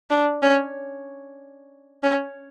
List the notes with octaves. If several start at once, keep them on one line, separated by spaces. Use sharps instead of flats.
D4
C#4
C#4